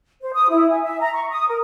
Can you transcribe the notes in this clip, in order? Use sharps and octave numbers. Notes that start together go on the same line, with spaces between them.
C5
D#6
E4
G#5
E5
A#5
C#6
D#6
A#4